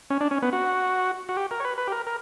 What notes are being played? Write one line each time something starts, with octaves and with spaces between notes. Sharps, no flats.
C#4
D4
C#4
B3
F#4
F#4
G4
A#4
C#5
B4
B4
G4
A#4
A#4